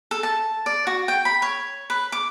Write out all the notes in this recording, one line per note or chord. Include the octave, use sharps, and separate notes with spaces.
A4
A5
D5
F#4
G5
B5
C#5
B4
D6